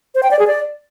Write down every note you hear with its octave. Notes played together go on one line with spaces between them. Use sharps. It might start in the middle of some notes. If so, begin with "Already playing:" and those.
C5
G5
D5
G#4
D5